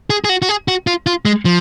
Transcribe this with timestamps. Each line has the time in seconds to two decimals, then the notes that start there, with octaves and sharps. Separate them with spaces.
0.10 G#4
0.25 G#4
0.29 F#4
0.42 F#4
0.49 G#4
0.68 F#4
0.87 F4
1.06 F4
1.25 G#3
1.45 F3